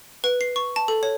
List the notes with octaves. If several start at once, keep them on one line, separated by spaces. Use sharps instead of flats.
B4
C7
C#6
A5
A4
C#5